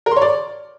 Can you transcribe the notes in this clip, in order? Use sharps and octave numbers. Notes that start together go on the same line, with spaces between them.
A#4
C6
C#5
D5